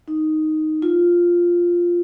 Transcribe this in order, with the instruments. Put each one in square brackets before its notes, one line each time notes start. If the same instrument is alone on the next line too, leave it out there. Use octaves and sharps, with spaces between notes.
[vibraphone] D#4
F4